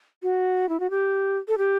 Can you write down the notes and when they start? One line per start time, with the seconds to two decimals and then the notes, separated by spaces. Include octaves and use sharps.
0.23 F#4
0.69 E4
0.80 F#4
0.90 G4
1.48 A4
1.58 G4